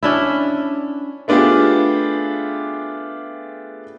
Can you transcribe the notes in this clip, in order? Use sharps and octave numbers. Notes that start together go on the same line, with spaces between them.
C#4 D4 E4
A3 B3 D4 F4 G4 G#4